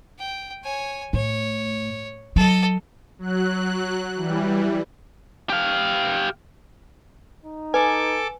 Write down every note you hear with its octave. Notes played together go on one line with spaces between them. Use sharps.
G5
C#5 G#5
A2 C#5
F#3 A4 D#5
F#3 F#6
E3 G3
G4 F5
D#4
A4 B4 G#5 D6